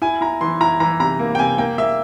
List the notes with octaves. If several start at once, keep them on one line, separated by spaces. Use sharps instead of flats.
E4 G#5
E4 A#5
E3 C6
E4 A#5
E3 A#5
C3 A#5
A#3
G5
C3 G#5
A#3 G5
A#3 E5